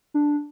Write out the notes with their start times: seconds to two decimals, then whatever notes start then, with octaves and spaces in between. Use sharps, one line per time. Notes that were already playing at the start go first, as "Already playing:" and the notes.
0.14 D4